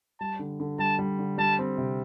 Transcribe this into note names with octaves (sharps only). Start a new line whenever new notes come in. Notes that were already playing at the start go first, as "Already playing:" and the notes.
G3 A5
D3
D3
G3 A5
G3
D3
G3 A5
C4
C3